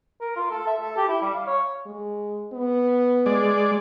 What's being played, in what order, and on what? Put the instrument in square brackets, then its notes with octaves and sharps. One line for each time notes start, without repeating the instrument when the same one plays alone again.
[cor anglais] A#4
F4
A4
E5
A4
G4
E4
G3
F5
C#5
[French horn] G#3
B3
[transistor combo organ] G#3 D5